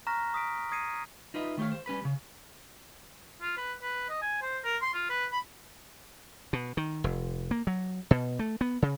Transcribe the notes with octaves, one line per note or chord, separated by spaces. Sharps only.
A#5 C#6 F6 F#6 A#6 B6
C#6 D#6 B6 D7
D#6 G#6 A#6 C7 C#7 D#7
D#4 F4 B4 D#5 E5
D#3 A3 G4 C#5 F5
C5
G3 C#4 B4 B5
D#2 C#3
F4
B4
B4
D#5
G#5
C5
A#4
C6
F4
B4
B5
B2
D#3
F1
A#3
F#3
B2
A3
B3
C#3